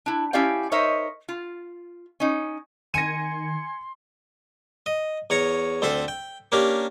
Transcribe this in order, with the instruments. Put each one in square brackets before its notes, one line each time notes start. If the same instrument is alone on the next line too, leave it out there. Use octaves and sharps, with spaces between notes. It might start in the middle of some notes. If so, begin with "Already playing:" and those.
[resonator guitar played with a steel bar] D4 E4
C#4 E4 G4 D5 F5 G5
D#4 A#4 C5 C#5 D#5 E5
F4
C#4 D#4
[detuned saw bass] D#3 [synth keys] G#5 G#6 C#7 [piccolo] C6 [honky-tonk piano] A#6 D#7
[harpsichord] D#5
E2 C#5 A#5 C#6
D2 C4 A4 E5 C6
G5
A#3 C#4 D4 G4 A#4